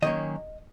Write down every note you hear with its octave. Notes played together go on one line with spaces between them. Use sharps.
D#3 F#3 A#3 C#4 D#5